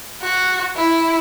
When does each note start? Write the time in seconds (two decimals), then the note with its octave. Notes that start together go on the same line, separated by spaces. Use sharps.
0.22 F#4
0.77 E4